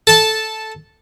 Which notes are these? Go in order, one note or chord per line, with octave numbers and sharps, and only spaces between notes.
A4 A5